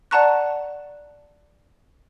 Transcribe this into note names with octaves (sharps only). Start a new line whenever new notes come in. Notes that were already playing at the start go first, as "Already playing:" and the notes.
D5 F#5 A5 A#5 C#6 F#6